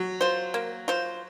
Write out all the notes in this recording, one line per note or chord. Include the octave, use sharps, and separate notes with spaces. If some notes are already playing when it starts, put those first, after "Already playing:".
Already playing: F#3
F4 C5
A#3
F4 C5